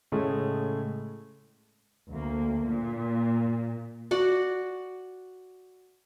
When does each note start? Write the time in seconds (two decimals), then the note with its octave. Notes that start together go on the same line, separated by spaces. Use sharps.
0.12 A2 C#3 G#3 A3
2.10 D2 A#3
2.67 A#2
4.11 F#4 D5 F#5